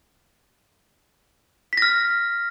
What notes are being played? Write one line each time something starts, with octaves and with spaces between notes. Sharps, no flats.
F6 A#6 B6